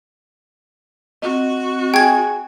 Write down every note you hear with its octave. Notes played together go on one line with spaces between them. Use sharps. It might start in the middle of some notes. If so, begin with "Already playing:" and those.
C4 F#4 D#5
G#4 G5 G#6